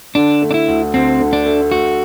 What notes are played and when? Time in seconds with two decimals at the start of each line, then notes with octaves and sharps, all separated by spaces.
0.15 D3 D4
0.42 A3
0.51 D4
0.54 E4
0.68 D2
0.94 D2 C4
1.20 D3
1.33 D4
1.46 A3
1.71 A3 F#4